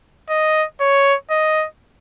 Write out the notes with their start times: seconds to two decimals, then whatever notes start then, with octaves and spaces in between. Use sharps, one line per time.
0.30 D#5
0.81 C#5
1.31 D#5